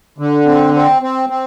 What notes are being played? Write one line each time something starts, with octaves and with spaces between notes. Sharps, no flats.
D3
C4
C4
C4
C4